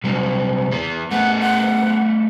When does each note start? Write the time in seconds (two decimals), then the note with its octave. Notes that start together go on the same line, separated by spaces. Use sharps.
0.04 C3 F#3 G3
0.71 E3 B3
1.12 A3 B3 F#5
1.41 F#5